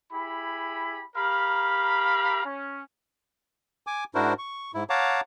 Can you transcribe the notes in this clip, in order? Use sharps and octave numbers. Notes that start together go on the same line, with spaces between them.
E4 G4 G#4 B5
G4 A#4 F5 A#5 B5
C#4
G#5 D6
G#2 D4 E4 F#4 A#4 C5
C#6
G#2 E4
C#5 F5 F#5 A5 A#5 D6